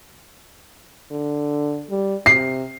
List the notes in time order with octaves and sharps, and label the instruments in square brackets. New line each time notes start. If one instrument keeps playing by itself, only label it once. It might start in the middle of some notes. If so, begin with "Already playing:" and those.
[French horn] D3
G3
[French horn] C3 [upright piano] C7